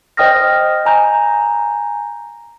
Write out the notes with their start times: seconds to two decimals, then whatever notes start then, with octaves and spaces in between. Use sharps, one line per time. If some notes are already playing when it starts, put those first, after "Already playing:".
0.17 C5 D#5 G5 D#6 F6 A#6
0.86 G#5 A#5 G6